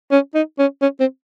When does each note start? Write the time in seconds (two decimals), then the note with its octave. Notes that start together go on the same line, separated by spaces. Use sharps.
0.11 C#4
0.35 D#4
0.59 C#4
0.82 C#4
1.00 C4